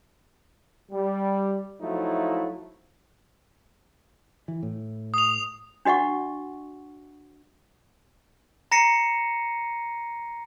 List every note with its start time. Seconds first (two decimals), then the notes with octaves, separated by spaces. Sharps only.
0.91 G3
1.81 F3 F#3 A3 D#4 E4
4.48 E3
4.63 A2
5.14 D#6 F7
5.85 D4 F#4 D#5 F#5 C#6
8.72 A#5 A#6 C7 C#7 D#7